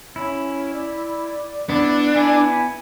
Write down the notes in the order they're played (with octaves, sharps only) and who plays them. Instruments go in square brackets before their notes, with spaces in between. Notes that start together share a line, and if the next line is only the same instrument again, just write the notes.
[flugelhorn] C#4 [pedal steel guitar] E4
[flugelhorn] D5
[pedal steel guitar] B3 E4 [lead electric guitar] D4
[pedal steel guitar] B3 E4 [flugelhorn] G#5